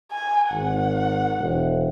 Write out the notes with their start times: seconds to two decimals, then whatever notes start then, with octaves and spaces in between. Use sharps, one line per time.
0.11 G#5
0.51 G#1 F#5
1.38 E1